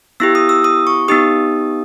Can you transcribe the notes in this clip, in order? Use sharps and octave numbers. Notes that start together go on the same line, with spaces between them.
B3 E4 G4 E6
D#6
E6
D#6
C#6
B3 D#4 G4 D#6